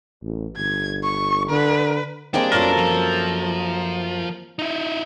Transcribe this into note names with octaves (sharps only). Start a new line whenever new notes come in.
A1
G1 G#6
C#6
D3 B4
G3 A#3 C4 D4 G#4 D#5 G5
F#2 F4 A4 A#4
F3
F3
D#4 E4